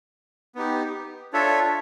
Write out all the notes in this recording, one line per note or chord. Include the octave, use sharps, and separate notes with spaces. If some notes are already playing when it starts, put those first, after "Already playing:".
B3 D#4 G4
D4 F4 A4 C#5 E5